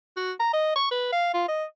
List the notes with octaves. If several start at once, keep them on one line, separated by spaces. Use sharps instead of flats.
F#4
A#5
D#5
C#6
B4
F5
F4
D#5